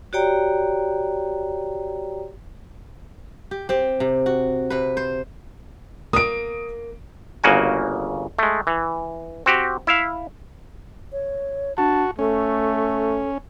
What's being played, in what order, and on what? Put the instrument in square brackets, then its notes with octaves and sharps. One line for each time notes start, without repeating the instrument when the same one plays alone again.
[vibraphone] F#4 G4 C#5 D5 G5 A#5
[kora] G4
C4 G4
C3
F#4
C3 B4
C5
[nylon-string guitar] A#3 [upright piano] D#6 D7
[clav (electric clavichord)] G1 C#3 A#3 F#4 G#5
G#3 A3
E3
C4 F#4 G4
E4 E5 F5
[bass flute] C#5
[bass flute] D4 [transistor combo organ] F#4 [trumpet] A5
[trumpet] A3 [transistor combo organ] C#4 [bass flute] A4